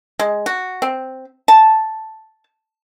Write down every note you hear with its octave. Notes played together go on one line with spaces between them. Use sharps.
G#3
F#4
C4
A5